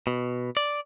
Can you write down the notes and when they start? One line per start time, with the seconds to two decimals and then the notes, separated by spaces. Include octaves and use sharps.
0.07 B2
0.57 D5